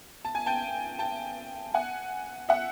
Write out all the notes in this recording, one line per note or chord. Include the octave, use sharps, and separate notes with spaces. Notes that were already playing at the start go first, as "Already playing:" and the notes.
A5
G#5
G5 A5
G5 A5
F#5 G#5
E5 F#5